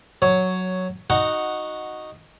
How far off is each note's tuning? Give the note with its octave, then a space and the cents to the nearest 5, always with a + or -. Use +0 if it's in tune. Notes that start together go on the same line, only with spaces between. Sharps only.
F#3 +0 C#5 +5
D#4 -5 F#4 -5 F#5 +0